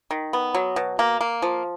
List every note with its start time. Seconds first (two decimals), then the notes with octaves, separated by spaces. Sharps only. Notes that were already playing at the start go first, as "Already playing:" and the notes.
0.11 D#3
0.33 B3
0.55 F#3
0.76 B2
0.99 A#3
1.21 A#3
1.42 F3